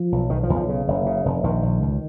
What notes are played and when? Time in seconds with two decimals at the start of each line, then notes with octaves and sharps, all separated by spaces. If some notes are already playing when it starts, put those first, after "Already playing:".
Already playing: F3
0.12 B1
0.30 B1 D#3
0.43 F3
0.49 B1
0.56 F3
0.69 C#3
0.88 F#1
1.06 C#3
1.25 F1
1.44 A#1 D#3
1.62 A#1
1.82 C#2